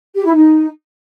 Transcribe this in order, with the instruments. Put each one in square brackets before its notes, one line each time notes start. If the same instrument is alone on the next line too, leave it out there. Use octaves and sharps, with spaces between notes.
[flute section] G4
E4
D#4